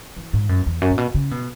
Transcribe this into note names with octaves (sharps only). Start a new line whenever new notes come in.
E3
G#2
F#2
E2
F#2
A#2
B2
C#3
B2